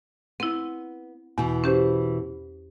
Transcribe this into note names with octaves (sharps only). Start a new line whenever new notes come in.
B3 C4 E4
E2 B2 E3
C#4 G4 C5